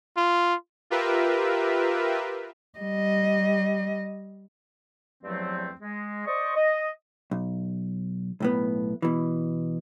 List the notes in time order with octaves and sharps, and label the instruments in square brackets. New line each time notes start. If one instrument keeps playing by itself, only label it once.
[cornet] F4
[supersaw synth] F4 G4 A#4 B4 E5
[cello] G3 D#5
[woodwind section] E2 G2 F3 F#3 A3 C4
G#3
C5 D5 D#5 C#6
D#5
[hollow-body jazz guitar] B1
B1 A2 B3
B2 E3